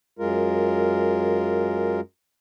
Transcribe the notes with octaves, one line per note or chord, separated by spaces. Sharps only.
F#2 G#3 F4 A#4